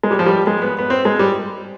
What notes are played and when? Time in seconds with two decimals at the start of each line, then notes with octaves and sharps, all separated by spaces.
0.03 G#3
0.11 G3
0.19 F3
0.26 G3
0.47 G#3
0.62 B3
0.78 B3
0.90 C4
1.05 G#3
1.19 G3